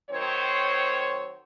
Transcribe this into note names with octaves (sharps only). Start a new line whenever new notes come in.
D#3 F#3 C4 C5 C#5